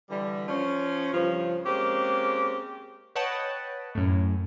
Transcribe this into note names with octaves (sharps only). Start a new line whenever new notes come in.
D3 E3 G3
F3 C#4
G2 C#3 F3
G#3 A#3 C4 C#4 G4
B4 C#5 D#5 F#5 G5 A5
F#2 A2